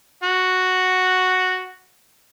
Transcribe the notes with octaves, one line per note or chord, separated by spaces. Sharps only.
F#4 F#5